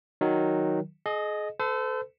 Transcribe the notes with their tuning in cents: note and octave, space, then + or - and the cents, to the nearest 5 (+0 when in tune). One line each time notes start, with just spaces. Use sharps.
D#3 +0 F#3 +0
G#4 +35 D#5 -10
A4 +0 C5 -40